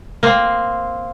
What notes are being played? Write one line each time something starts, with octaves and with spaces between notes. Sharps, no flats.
A#3 C4